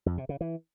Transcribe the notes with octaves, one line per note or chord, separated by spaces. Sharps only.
F2
C3
C#3
E3